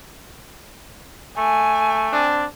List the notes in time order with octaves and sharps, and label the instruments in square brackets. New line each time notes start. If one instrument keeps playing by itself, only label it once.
[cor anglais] A3 [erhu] G#5
[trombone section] C4 D4